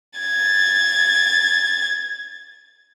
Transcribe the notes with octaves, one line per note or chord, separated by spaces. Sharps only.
G#6 A6